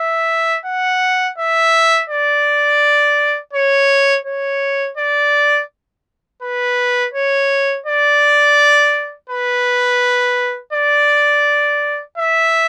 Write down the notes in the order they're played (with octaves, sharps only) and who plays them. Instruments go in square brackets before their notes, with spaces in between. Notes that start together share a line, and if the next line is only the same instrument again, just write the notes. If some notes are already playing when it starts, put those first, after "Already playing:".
Already playing: [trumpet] E5
F#5
E5
D5
C#5
C#5
D5
B4
C#5
D5
B4
D5
E5